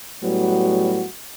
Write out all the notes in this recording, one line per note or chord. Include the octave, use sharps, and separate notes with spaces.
A2 F#3 G3 B3 F#4